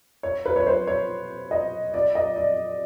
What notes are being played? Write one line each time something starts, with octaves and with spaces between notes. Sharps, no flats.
C#5
B4
C#5
C5
C#5
D#5
D5
D#5
D5